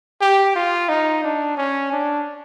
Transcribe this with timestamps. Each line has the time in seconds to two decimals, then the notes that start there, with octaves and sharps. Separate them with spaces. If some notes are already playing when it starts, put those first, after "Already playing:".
0.21 G4
0.55 F4
0.89 D#4
1.24 D4
1.57 C#4
1.92 D4